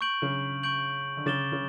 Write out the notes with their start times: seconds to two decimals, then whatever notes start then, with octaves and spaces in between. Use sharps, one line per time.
0.01 C#6 G6 D7 F#7
0.22 C#3
0.63 C#6 G6 D7 F#7
1.17 D3
1.26 C#3 D6 A6 E7 G7
1.52 C#3